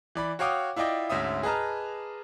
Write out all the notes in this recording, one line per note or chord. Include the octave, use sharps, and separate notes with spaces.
E3 D5 B5
F#4 C#5 F5 G5 D6 D#6
E4 F4 D5 D#5 G5 D6
D2 G#2 C#4 E5 D#6
G#4 B4 D#5 A5 A#5 F6